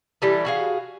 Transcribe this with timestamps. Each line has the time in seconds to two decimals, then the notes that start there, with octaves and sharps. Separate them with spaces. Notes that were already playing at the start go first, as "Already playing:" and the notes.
0.22 E3 G3 A3
0.45 F#4 G#4 F5